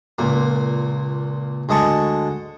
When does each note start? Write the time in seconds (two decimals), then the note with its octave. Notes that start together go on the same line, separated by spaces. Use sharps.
0.19 C#2 A#2 A#3
1.69 D2 G#3 D#5 A5 C#6